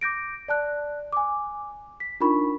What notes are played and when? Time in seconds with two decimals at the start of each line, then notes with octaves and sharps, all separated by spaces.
0.01 D6 G6 A#6 D7
0.48 D5 A5 F#6
1.13 G#5 D6
2.00 B6
2.20 D4 D#4 F4 A#4 B5 C#6